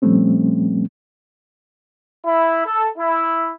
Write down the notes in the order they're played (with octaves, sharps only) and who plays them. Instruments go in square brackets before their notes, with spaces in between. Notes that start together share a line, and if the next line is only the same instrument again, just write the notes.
[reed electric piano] A#2 F3 G3 A3 C4 C#4
[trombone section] E4
A4
E4